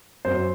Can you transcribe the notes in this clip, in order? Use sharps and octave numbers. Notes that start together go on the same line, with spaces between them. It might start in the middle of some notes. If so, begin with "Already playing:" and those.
F#2 C5